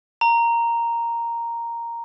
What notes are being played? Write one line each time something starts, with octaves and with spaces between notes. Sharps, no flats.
A#5